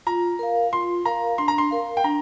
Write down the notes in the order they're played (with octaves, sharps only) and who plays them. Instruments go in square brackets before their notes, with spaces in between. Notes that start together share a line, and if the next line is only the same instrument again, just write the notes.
[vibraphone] F4 [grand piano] A#5
[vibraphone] A#4 F5
[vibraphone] F4 [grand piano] C6
[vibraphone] A#4 F5 [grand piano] A#5
[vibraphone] D4 [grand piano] C6
[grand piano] A#5
C6
[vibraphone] A#4 F5
[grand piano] G5
[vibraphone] D4 [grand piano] A#5